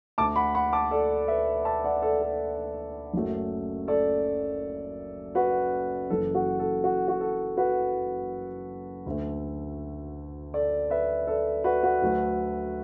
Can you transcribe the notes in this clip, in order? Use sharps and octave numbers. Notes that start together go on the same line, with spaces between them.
D2 D3 A3 A5 D6
F#5 B5
F#5 B5
A5 D6
A4 D5
B4 E5
E5 A5
D5 F#5
A4 D5
A4
F#1 F#2 F#3 A3
A4 D5
F#4 B4
F#1 F#2 E3 A4
F#4
A4
F#4
F#4
A4
F#4 B4
D2 D3 A3
A4 D5
B4 E5
A4 D5
F#4 B4
F#4 B4
D2 D3 F#3 A3